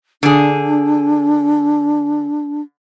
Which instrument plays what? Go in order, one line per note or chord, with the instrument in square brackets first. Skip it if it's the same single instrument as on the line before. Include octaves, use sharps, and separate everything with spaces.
[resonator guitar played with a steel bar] D3 G#4 [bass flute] D4